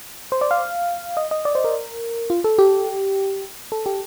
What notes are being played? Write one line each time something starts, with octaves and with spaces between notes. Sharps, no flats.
C5
D5
F5
D#5
D#5
D5
C5
A#4
F4
A4
G4
A4
G4